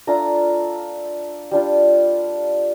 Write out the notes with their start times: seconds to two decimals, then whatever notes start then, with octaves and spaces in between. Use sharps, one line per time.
0.07 A3 D4 F4 A#5
1.51 G3 D4 F4